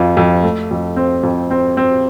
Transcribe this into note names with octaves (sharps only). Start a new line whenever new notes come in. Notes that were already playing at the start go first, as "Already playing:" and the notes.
Already playing: F2 F4
F2
A3
F2
C4
F2
C4
C4